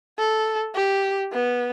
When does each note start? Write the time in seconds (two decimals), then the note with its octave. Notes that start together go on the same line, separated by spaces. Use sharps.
0.18 A4
0.75 G4
1.32 B3